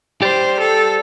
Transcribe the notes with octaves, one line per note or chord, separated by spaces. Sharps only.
G4 C5 D5
A4